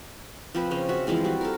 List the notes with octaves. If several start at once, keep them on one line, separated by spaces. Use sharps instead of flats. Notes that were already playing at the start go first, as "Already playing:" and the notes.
F3 C4 B4
C#3 C4 C#4
F#4 E5
E3 F3 G#3 C4
G3 F#4
A4 A#4